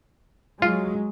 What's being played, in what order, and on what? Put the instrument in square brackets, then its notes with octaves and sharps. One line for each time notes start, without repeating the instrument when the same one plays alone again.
[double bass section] F#3 G#3 [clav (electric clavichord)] F4